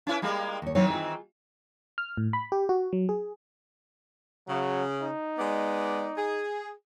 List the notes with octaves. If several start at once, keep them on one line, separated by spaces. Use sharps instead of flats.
C#4 E4 B4
G3 G#3 A#3
D#2 C#5
D#3 E3 F#3 C4 C#5
F4 G#4
F6
A2
B5
G4
F#4
F#3
G#4
C#3 F#3
D#4
G#3 B3 D5
G#4